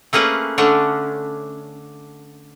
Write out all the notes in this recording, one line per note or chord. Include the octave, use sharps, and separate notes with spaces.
A3 A#3 C#4 G#4 B4
D3 A3 C#4 D4